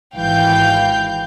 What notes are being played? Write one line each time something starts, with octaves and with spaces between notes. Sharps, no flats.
G#1 E3 F5 G5 G6